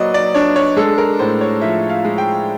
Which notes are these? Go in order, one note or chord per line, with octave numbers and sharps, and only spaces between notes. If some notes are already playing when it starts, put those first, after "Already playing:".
Already playing: F#3 A#3 B4 D5 D#5
D5
D4 C#5
C#5
G#3 A4
A#4
A2 C5
C#5
F3 E5
F5
G#3
G5